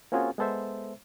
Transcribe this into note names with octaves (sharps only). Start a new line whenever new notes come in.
A#3 C4 C#4 F4 F#4 G#4
G#3 B3 A4 C5 E5